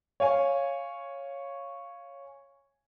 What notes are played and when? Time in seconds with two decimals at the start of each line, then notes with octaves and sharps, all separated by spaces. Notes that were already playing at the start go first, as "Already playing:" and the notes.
0.20 C#5 F5 G#5